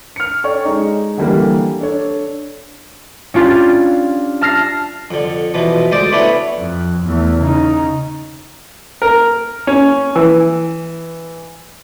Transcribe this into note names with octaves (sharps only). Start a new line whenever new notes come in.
F6 C#7
A4 C#5 D5 G5 C#6
G#3 D#4
D3 E3 G3 A#3 A#4
D4 A4 C#5
C#4 D4 F4 G4
A5 F6 A#6 C7
F2 D3
B2 E3 F3
D2 G#3 C5 D5 D6
A3 B3 C#4 D4 E4
F2
E2 A3
C#3 D#4
A#4
C#4
E3